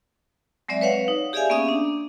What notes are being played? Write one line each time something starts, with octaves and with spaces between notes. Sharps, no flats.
F#3 G#3 C4 D5 E5
B4 C#5 F5 F#5
D#4
G4 G#4 D5 E5 F5 G#5
A#3 B3 C#4 E5 D#6
D4